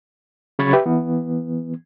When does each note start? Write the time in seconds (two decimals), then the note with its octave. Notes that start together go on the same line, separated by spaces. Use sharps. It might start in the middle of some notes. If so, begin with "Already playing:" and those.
0.59 C#3 F#3 B5 C#6 G#6 A6
0.73 G4 B4 E5
0.86 E3 B3